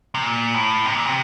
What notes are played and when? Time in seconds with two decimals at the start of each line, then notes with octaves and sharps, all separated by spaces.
0.15 C3
0.23 A#2
0.54 A2
0.85 C3
0.95 A#2
1.06 C3